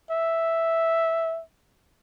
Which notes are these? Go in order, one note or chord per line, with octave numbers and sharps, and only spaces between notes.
E5